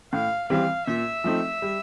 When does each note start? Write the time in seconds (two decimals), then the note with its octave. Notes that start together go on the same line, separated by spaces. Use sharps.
0.13 A2 F5
0.50 E3 G3 C4 F5
0.87 A#2 E5
1.24 F3 A3 C4 D#4
1.62 G3